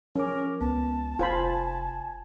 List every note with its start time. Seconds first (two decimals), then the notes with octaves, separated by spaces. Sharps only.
0.16 F3 C#4 A#4 D6
0.61 C#2 B3 A5
1.19 F1 F4 C5 G#5 B5 G#6